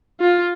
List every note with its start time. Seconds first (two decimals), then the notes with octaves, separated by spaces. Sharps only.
0.20 F4